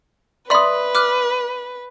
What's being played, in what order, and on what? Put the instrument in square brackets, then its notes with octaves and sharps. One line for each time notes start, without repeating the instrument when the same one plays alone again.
[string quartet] B4 [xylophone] D5 E5 B5 [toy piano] C6 D#6
[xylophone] D6 F6 F#6